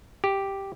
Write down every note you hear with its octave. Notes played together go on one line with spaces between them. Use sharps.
G4